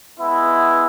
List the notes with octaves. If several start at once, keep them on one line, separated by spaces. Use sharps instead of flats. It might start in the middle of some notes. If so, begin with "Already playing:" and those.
G#3 B3 E4